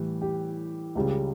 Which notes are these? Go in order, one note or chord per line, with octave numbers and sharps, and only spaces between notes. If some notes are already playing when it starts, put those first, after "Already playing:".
Already playing: A2 E3 G3
G4
C#2 C#3 G3